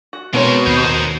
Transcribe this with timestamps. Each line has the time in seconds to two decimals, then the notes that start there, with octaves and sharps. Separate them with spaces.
0.13 F#4
0.34 B2 G#3 C4 A#4 C#5 A#5
0.67 D#2 D#4 C5
0.82 A#4